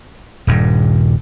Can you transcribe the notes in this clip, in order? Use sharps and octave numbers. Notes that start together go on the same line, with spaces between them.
D#1 G2